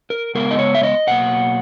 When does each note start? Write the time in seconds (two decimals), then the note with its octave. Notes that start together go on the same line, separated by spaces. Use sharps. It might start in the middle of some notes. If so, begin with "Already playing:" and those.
0.10 A#4
0.35 C#3 G#3 B3 A#4
0.51 D#5
0.59 C#5
0.75 E5
0.83 D#5
1.07 B2 F#3 A#3 F#5